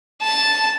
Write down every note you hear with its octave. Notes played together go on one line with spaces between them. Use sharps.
A5